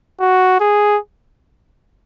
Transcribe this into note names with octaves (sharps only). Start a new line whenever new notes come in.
F#4
G#4